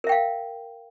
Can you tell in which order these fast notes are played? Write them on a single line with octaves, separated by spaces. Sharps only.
A#4 E5 G5 F5